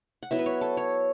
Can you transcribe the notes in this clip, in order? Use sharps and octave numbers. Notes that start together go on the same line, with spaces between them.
F#5
F#3 B3 E4 E5
B4
C#5
A4
C#5